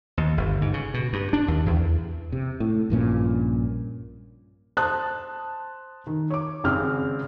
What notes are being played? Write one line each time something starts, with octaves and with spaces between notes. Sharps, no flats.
D#2
G1
G#2
C#3
B2
G2
D4
D#2
E2
C3
A2
A#1 G2 A#2 C#4
C5 A5 D#6 F#6
D#3
C#5 D6
G#1 C#3 G#3 C4 F6